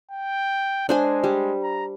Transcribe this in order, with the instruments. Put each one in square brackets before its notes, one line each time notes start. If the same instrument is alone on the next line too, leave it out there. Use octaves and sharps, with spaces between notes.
[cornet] G5
[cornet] G#3 [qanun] D4 C5 G#5
[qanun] G3
[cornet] A#5